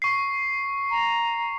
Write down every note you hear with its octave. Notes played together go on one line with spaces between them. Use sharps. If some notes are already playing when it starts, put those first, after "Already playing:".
C#6 C7
A#5